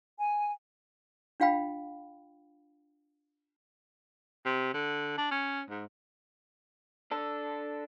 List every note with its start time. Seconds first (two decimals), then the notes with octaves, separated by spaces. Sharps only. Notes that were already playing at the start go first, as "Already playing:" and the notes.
0.19 G#5
1.40 D4 F4 F5 G5 B5
4.45 C3
4.74 D3
5.18 D4
5.31 C#4
5.70 G#2
7.11 D4 A4